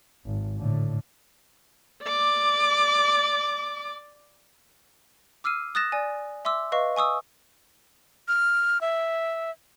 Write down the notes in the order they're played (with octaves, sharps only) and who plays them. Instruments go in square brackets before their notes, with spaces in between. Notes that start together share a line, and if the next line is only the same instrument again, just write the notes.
[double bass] G#1
A2 D3
[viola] D5 D6
[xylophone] D6 E6 F6 C7 D#7
D#6 F#6 A6 A#6 E7
D5 G#5
E5 C6 D6 E6
B4 D#5 F5 C#6
G#5 C#6 D#6 E6
[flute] F6
E5